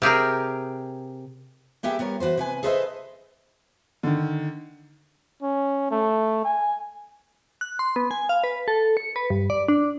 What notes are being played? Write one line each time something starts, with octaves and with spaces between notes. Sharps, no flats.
C3 G4 G#4 A#4
A#3 B3 G4 G#4 E5 G5
G3 B3 A#4 C#5
E3 F#4 B4 C5
C3 B4 G#5
G#4 A4 B4 C5 D#5 E5
D3 D#3
C#4
A3
G#5
F#6
C6
B3
G#5
F5
B4
A4
C#7
B4
G2
D5
D4